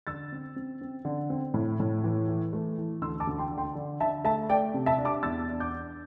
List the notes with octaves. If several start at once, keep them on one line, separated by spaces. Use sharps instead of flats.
D3 E6 A6
C4
C4
C4
D3
C4
A2
A2
E3
E3
A3
E3
D2 C6 E6
A5 D6
D2
G5 C6
D3
G5 C6
D3
D3 E5 A5
A3 E5 A5
A3 D5 G5
C3
E5 A5
D4
A5 D6
E2 E6 A6
D4
D6 G6
D4